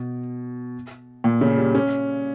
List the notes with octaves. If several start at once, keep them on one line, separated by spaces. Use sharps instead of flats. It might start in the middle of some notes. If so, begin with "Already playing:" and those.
Already playing: B2
A#2
C#3
G3
C#4